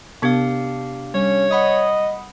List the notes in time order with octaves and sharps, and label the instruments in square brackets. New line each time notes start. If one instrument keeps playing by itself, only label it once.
[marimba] C3 B3 G#6 [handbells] D4 G4 F5
[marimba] G3 [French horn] C#4 [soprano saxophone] C#5
[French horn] D#5 [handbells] F#5 B5 D#6